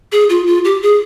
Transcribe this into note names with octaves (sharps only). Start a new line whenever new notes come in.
G#4
F4
F4
G4
G#4